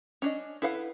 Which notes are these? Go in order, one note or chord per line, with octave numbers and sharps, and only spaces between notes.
C#4 D4 D#5
E4 A4 B4 F5 F#5